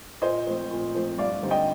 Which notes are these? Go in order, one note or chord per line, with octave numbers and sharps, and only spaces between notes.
A#2 C5 D#5
F3 A3 C4
A#2
F3 A3 C4
G2 D5 F5
D3 G3 C4 D#4
D#5 G5